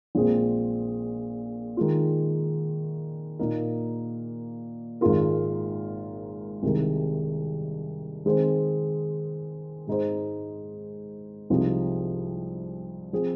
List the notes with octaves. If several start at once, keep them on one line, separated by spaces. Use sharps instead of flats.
A#1 A#2 G#3 C4 G#4
D#3 G#3 F4
A#2 A#3 D#4 A#4
G#1 G#2 G#3 F4 A#4
C2 C3 D#3 G#3
D#3 G#3 C4 G#4 C5
G#2 G#3 D#4 G#4 C5
C2 C3 F3 G#3 D#4
F3 C4 G#4